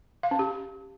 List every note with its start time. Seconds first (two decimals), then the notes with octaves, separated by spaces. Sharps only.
0.23 F5
0.31 C#4
0.39 G4